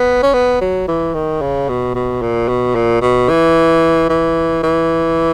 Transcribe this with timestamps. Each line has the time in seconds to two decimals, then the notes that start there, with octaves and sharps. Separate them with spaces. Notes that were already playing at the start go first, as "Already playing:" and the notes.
Already playing: B3
0.23 C#4
0.34 B3
0.61 F#3
0.88 E3
1.14 D#3
1.41 C#3
1.69 B2
1.95 B2
2.22 A#2
2.48 B2
2.75 A#2
3.01 B2
3.29 E3
4.09 E3
4.63 E3